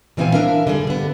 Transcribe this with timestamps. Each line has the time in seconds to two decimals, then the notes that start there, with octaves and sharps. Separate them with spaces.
0.17 A#2 E3 B3 C4 F5 G#5
0.33 D4 A#4 E5 F5
0.67 D3 G3 G#4
0.87 D3 B3